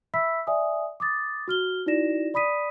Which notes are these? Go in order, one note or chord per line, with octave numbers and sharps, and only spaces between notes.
E5 B5 E6 B6
D5 E5 G#5 D#6
D6 D#6 A6
F#4 F6 G7
D#4 E4 F#4 D5 A#6 E7
D5 B5 D#6 B6 D#7